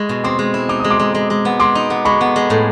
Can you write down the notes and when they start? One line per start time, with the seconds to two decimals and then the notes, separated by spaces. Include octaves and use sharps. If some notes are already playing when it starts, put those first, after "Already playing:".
Already playing: G#3 E4 C#6 D#6
0.09 B2
0.24 C4 C6 D6
0.39 G#3
0.54 E4
0.69 D#4 D6
0.80 G#3 D#6
0.90 C6 D6
0.99 G#3
1.15 G#3
1.30 G#3
1.45 B3
1.60 G#3 C6 D6
1.75 D#4
1.90 B3
2.05 G#3 B5 C#6
2.21 B3
2.36 G#3
2.50 A2